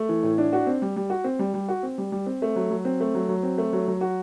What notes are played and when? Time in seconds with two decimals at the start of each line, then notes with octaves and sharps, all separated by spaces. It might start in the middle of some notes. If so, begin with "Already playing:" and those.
Already playing: A3
0.09 E3
0.23 A2
0.38 D4
0.53 F#4
0.67 C4
0.82 G3
0.96 G3
1.10 F#4
1.24 C4
1.39 G3
1.54 G3
1.69 F#4
1.83 C4
1.98 G3
2.12 G3
2.26 C4
2.42 A3
2.56 F#3
2.71 F#3
2.85 C4
3.00 A3
3.14 F#3
3.29 F#3
3.43 C4
3.58 A3
3.73 F#3
3.88 F#3
4.01 F#4